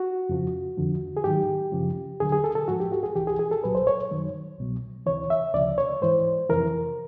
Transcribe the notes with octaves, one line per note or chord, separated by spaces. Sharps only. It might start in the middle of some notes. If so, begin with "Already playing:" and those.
Already playing: F#4
F2 C#3 F3
F2 D3 F3
G#4
G#2 D#3 F#3 G4
F#2 C#3 F3
D#2 D3 F#3 G#4
G#4
A4
A4
G#2 F3 F#4
G4
F#4
G#4
C2 C3 E3 G4
G#4
G#4
A4
C2 A#2 F#3 B4
C5
C#5
F#2 D#3 F#3
C2 B2 F#3
D2 C3 E3 C#5
E5
D2 C#3 F3 D5
C#5
G#2 E3 C5
F2 C3 E3 A#4